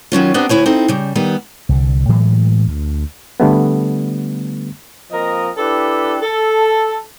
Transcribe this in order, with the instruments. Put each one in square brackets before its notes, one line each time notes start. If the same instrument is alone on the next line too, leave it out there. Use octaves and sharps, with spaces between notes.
[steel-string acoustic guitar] D#3 F#3 C#4 F4
B3 C4 D4 G4 A#4
D2 E4 C#5 G#5
C4 D#4 E4 A4
C#3 G3
D#3 G3 B3
[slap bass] C2 D3
A2 E3 F#3 G#3
D2
[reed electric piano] D3 G3 A3 B3
[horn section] F3 A#3 C4 A#4 D#5
D4 E4 G4 A4 B4
A4